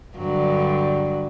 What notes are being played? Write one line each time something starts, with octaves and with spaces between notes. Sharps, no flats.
G2 D3 F#3